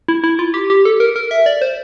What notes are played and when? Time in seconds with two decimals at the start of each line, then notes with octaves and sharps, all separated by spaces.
0.08 E4
0.24 E4
0.39 F4
0.54 G4
0.70 G4
0.85 A4
1.00 A#4
1.16 A#4
1.31 E5
1.46 D5
1.62 C5